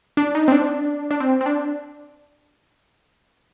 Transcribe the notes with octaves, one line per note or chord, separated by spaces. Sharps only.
D4
D#4
C4
D4
D4
C4
C4
D4